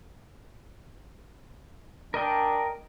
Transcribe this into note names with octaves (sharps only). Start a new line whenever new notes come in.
D4 A#4 D#5 G5